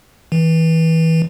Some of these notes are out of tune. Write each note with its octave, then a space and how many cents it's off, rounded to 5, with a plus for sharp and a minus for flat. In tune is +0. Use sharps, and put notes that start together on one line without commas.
E3 -25